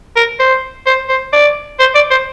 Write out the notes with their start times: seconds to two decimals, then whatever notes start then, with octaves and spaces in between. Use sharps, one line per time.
0.16 A#4
0.39 C5
0.86 C5
1.09 C5
1.33 D5
1.79 C5
1.95 D5
2.11 C5